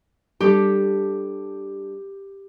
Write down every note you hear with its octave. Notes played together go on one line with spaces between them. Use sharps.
G3 D4 G4 A4